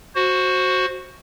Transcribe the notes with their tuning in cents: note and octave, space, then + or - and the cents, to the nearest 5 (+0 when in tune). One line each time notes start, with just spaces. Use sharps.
F#4 +0 C5 +15